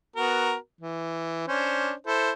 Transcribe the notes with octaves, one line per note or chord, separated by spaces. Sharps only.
B3 F#4 A#4
E3
C#4 D4 C5
E4 A4 C5